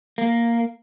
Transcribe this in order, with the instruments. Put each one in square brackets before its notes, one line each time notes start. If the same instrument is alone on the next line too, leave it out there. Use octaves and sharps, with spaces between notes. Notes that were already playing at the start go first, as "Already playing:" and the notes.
[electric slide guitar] A#3